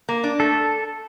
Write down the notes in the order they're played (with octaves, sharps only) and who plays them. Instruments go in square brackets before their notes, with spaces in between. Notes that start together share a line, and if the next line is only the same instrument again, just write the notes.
[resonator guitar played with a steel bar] A#3
D4
[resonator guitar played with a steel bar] A3 [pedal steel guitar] A4